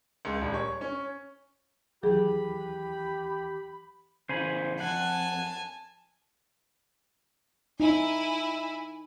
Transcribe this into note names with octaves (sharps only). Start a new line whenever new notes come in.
C#2
D#1
C#5
C#4
D#2 E3 F#3 G4 G#4 B5
C#3 E3 C5 G#5 B5
F2 F#5 G#5 A5
D#4 E4 G#5